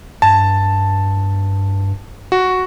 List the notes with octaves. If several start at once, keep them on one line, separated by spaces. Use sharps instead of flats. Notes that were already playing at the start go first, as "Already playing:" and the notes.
G2 A5
F#4